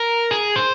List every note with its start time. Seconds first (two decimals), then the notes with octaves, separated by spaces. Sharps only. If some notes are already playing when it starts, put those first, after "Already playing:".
Already playing: A#4
0.31 G#4
0.56 C5